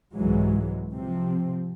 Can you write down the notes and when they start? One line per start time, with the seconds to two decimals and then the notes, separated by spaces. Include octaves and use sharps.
0.15 C2 G#2 E3 F#3 G#3
0.94 C3 F3 C4